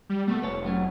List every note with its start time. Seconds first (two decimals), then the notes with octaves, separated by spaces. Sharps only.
0.09 G3
0.27 B2 G3 A3 A#3
0.42 F1 B4 C#5 A5
0.64 F#3 A3 C#4